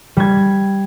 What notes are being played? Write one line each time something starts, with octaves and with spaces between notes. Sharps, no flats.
G3 G#6